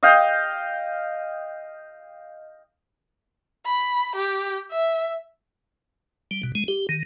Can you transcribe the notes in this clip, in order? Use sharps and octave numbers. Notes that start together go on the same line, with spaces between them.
D#5 F5 G5
B5
G4
E5
G3
B2
G#3
G4
D#3